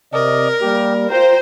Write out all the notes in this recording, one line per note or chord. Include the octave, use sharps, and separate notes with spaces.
C3 A#4 D5 D#5
G3 A#3 G4
F4 C5 G5 A#5